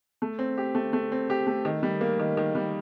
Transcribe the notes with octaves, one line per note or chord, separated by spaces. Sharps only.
A3
C4
G4
A3
A3
C4
G4
A3
D#3
G3
A#3
D#3
D#3
G3